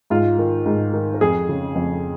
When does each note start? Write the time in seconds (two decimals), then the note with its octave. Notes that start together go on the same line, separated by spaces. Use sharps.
0.10 G#2 F4
0.38 D#3
0.66 G#2
0.93 D#3
1.14 A#4
1.21 F2 G#4
1.49 C#3
1.75 F2